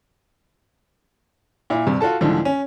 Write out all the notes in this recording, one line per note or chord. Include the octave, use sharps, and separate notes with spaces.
A#2 E4
G2 C3
F4 F#4 A4 A5
C2 G#2 D3 E3 F3
C#4